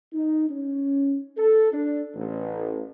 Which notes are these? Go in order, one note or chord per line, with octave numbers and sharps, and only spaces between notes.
D#4
C#4
A4
D4
A1